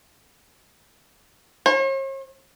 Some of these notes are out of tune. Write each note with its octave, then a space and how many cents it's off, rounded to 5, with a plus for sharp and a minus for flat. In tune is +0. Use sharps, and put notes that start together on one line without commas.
C#5 -45